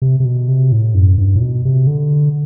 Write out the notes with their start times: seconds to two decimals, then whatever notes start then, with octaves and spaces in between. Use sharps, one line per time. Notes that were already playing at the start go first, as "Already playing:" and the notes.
0.02 C3
0.20 C3
0.25 B2
0.48 C3
0.72 A2
0.95 F#2
1.18 G2
1.35 A2
1.41 B2
1.65 C3
1.87 D3